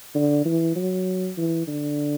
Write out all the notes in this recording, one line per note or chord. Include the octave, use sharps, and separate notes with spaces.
D3
E3
F#3
E3
D3